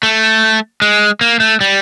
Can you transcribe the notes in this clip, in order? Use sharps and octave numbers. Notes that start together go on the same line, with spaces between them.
A3
G#3
A#3
A3
G3